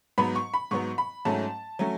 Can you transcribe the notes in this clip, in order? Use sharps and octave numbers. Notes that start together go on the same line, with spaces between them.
G#2 F#3 B3 B5
C#6
B5
G#2 F#3 B3 C#6
B5
G#2 F#3 A3 C#4 A5
F#3 A3 C#4